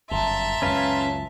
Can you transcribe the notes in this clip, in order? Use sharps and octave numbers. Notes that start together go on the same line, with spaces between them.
G1 F#2 E5 A5 A#5 C6
C#2 F#2 C#4 B4 F5